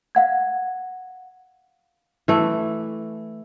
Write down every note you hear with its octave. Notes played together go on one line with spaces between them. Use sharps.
F5 F#5 G#6
E3 A3